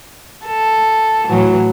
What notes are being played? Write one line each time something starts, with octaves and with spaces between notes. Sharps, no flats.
A4
A2 E3 F#3